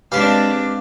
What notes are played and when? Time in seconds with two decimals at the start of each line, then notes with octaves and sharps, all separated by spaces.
0.12 G#3 C4 D4 G4 B4 F5